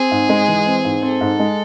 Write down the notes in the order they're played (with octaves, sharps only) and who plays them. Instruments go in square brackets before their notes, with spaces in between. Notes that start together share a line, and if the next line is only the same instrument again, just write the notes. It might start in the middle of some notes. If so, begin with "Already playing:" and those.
Already playing: [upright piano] C4 [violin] G#4
[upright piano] G#2
G#3
E3
C4
G#2
[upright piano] C4 [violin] A4
[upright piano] G#2
G#3